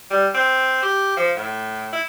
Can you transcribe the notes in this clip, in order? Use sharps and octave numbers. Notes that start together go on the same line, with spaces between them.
G3
C4
G4
F3
A2
E4